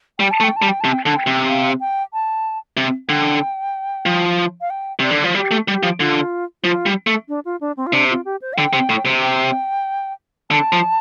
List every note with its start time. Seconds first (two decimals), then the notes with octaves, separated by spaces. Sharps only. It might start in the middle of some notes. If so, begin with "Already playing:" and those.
0.19 G3 G5
0.31 A5
0.40 A3
0.44 G5
0.56 A5
0.62 G3
0.69 G5
0.81 C3 A5
0.93 G5
1.05 D3 A5
1.17 G5
1.27 C3
1.49 F5
1.80 G5
2.13 A5
2.77 C3
3.09 D3 G5
4.06 F3
4.61 F5
4.70 G5
4.99 C3 D5
5.11 D3
5.24 F3
5.35 G3 G4
5.51 A3
5.67 G3 G4
5.83 F3
5.99 D3 F4
6.64 F3 F4
6.86 G3
7.07 A3
7.28 D4
7.45 F4
7.61 D4
7.77 C4
7.87 F4
7.93 C3 D4
8.10 F4
8.25 G4
8.42 C5
8.53 F5
8.57 D3 G5
8.73 C3
8.90 A2
9.06 C3
9.23 G5
10.51 D3 A5
10.72 F3